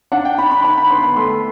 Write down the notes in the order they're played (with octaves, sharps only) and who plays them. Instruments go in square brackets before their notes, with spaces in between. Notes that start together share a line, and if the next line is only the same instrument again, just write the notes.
[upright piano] D4 F#5
G5
D4 B5
B5
D4 B5
B5
B3 C6
B5
A3 C6